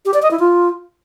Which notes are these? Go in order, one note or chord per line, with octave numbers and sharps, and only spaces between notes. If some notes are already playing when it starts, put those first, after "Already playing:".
G4
D5
D#5
E4
F4